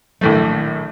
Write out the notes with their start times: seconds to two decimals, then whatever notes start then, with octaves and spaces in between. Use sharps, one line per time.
0.21 A#1 A2 D#3 F#3 A3